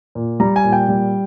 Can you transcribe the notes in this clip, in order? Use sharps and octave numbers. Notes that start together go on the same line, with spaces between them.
A#2
G3 A#5
G#5
A#2
G5
G3